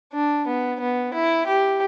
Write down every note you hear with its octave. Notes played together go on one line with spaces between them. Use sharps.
D4
B3
B3
E4
G4